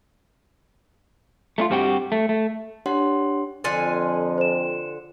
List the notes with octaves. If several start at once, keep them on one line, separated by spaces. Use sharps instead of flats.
A3 D4 F4
G2 G3 C4 F#4 G4
A3
A3
D4 G4 C#5 F#5 C6
F2 D3 F4 G#5
C5 E7